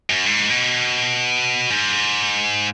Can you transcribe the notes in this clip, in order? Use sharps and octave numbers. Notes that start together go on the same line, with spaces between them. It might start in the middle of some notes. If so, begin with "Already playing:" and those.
F#2
G#2
B2
G#2